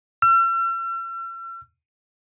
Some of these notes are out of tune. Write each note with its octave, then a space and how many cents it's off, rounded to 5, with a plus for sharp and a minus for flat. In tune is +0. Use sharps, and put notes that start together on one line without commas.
E6 +45